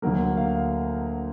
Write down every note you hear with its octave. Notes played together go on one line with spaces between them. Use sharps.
D2 D3 F#3 A#3 A#4
F5